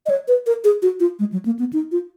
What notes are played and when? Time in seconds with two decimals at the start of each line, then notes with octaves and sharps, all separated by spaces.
0.06 D#5
0.10 C#5
0.28 B4
0.47 A#4
0.64 G#4
0.82 F#4
1.00 F4
1.19 G#3
1.32 F#3
1.45 A#3
1.59 B3
1.73 D#4
1.92 F4